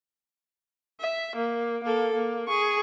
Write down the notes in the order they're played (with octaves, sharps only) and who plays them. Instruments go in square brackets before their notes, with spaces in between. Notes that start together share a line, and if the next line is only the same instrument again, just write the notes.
[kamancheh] E5
A#3
A#3 A4
A#3
G#4 C#6